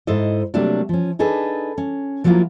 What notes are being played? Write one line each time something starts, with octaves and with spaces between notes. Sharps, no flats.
G#2 E4 A4 C5 D#5
C3 F#3 G3 A3 A#3 D4
F3 C#4
D4 D#4 G#4 A4 B4
C#4
F3 F#3 A#3 E4 F4